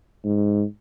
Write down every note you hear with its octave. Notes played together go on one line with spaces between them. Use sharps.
G#2